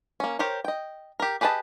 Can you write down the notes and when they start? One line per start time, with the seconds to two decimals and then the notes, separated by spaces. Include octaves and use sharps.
0.20 A#3 C#4
0.39 G4 A#4 C5 C#5
0.64 D#5 G5
1.20 G4 A#4
1.41 G4 G#4 B4 D#5 A5